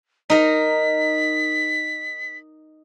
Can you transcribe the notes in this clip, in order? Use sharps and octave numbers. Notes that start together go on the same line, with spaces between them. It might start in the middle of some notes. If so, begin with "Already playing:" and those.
D#4 A#4 A#5 B6